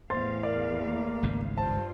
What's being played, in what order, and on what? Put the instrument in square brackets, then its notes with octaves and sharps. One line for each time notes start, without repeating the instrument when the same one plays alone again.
[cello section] E2 A2 F5 [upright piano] C5 C6 A6
[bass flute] A#4 [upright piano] D5
[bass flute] A#3
[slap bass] G#1 C#2 G#2
[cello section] G2 F4 [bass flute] C5 [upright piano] A5